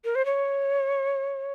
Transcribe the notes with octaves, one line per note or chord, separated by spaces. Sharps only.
A#4
C5
C#5